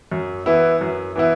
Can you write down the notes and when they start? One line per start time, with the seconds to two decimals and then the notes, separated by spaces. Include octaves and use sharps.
0.12 F#2
0.46 E3 B3 E4
0.81 F#2
1.16 E3 B3 E4